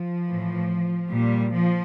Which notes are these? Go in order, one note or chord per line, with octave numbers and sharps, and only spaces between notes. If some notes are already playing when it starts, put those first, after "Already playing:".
Already playing: F3
A2 E3
A#2 G3
F3